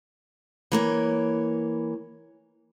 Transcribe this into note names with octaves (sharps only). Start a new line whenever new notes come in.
E3 A#3 C#5